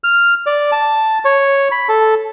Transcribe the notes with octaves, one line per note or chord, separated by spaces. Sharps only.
F6
D5
A5
C#5
B5
A4